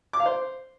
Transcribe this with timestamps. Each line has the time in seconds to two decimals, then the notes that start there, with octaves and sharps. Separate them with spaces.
0.13 D6
0.20 F5
0.26 C5